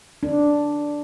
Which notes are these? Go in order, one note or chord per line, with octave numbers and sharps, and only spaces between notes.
D4